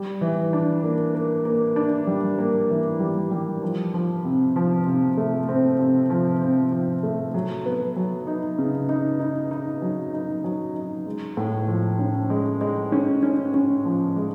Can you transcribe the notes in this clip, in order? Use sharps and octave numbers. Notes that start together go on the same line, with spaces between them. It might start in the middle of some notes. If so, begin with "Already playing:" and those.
Already playing: G3
E3
D4
A#3
A#3
A#3
D4
G3
A#3
E3
G3
G3
F3
F3
C3
F3
C3
A3
C4
C3
F3
C4
F3
A3
F#3
B3
F#3
D#4
C#3
D#4
D#4
D#4
F#3
D#4
F#3
D#4
G#3
A2
F3
C#4
G#3
G#3
C#4
C#4
C#4
F3
G#3